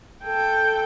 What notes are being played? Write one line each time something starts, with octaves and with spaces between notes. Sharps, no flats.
A4 G5